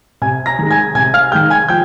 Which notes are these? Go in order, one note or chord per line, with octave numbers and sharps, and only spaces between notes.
C3 G#5 G#6
A#5 A#6
D#3 G#3
G#5 G#6
C3 G#5 G#6
F5 F6
D#3 G#3 G5 G6
G#5 G#6
F3 G5 G6